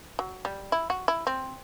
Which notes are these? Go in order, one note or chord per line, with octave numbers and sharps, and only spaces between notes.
F#3
G3
E4
F#4
E4
C4